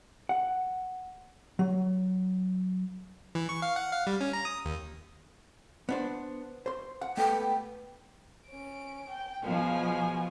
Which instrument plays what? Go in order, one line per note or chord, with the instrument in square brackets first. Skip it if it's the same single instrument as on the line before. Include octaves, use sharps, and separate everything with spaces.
[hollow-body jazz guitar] F#5
F#3
[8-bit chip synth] E3
C#6
F5
F#5
F5
G3
C#4
A#5
D#6
D#2
[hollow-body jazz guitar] B3 D4 C5
C5 C6
F#5
[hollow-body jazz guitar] A3 B3 [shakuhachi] G5
[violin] C#4 D7
G5
[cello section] B2 F3 [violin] G#4 G#5